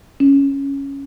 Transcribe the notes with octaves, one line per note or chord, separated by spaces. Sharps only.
C#4